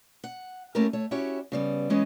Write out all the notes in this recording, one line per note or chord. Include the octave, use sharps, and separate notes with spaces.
F#5
A3 A#3 C#4 E4 G4 A#4
A3 C#5
C#4 E4 F#4 G4 C#5
C#3 G3 B3
E3 G#3 B3 C#4 D#5